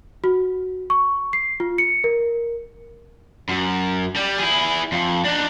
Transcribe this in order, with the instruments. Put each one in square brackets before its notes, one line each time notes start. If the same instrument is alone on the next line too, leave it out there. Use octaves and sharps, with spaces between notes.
[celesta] F#4
C#6
C7
F4
C#7
A#4
[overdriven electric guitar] F#2
G3
E4 G#4
F2
D4 D#4